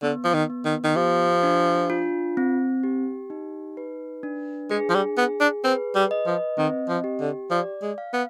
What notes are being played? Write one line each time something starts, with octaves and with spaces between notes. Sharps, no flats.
D3 B3
F3
D#3
B3
D#3
D#3
F3 G4
D4
F4
C4
G4
D#4
B4
D4
G#3 G#4
F3
G3
B3 G#4
D4
C4 B4
G3
D#5
F3
D#3 C4
F3
G4
D3
F3 D5
G#3
F5
B3